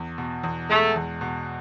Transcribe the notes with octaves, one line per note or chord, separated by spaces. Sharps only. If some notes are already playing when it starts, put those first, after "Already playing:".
Already playing: E2
B2
E2
G#3 A3
E2
B2